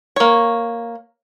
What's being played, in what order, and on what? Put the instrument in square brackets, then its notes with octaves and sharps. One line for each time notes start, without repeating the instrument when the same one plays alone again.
[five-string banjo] A#3 C#5